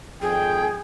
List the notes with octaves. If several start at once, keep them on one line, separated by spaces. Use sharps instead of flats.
G#1 F2 G#4 G5